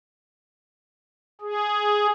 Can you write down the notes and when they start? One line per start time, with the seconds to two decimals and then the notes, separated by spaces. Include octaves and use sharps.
1.41 G#4